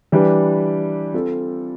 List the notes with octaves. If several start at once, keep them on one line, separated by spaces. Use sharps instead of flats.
E3 G3 D4 G4 B4
C4 F4 A4